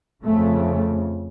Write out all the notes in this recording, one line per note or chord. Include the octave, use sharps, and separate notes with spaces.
F2 C#3 A3